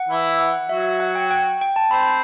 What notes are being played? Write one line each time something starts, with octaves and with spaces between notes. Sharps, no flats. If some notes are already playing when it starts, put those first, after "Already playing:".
Already playing: F#5
E3 E4
F#5
F#5
F#3 F#4 E5
F#5
G5
G5
G5
A5
C4 C5 B5